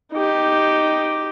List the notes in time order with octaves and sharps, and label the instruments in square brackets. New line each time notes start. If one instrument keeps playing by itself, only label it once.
[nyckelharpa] D#4 G4